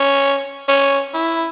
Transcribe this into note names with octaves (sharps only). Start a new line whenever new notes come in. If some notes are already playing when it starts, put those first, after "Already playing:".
Already playing: C#4
C#4
E4